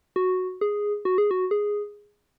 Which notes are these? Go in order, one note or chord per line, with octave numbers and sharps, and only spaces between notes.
F#4
G#4
F#4
G#4
F#4
G#4